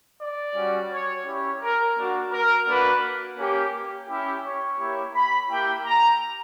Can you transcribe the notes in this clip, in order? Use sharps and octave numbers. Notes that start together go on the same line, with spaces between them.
D5
G3 C#4 F#4
C#5
C#4 E4 G4 C#5
A#4
A#3 D4 F#4
A#4
A#3 D4 F#4 B4
A#3 C#4 G4
C#4 E4 G4
C#5
A#3 E4 G4
B5
A#3 E4 G4 G5
A#5